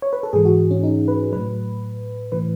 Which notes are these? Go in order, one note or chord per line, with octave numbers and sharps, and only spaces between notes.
C#5
B4
A4
G#2 E3 G#4
F#4
C#4
D#4
B4
A2 F#3 B4
A2 E3 B4